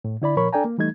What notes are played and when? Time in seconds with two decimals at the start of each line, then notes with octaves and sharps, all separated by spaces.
0.05 A2
0.22 D3 E4 D5 B5
0.37 A#2 F3 A#4 C#5 B5 C#6
0.53 D4 A4 D5 G5 G#5 A#5
0.65 A#3
0.78 E3 G3 A3 D#4 G#6